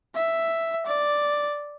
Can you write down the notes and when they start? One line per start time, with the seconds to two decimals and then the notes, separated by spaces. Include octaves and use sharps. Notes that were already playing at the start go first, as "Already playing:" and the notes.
0.15 E5
0.87 D5